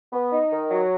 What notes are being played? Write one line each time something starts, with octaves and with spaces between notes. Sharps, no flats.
B3
D#4
D#3
F#3